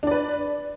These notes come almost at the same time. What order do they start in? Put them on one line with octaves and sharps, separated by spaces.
D4 D5 B4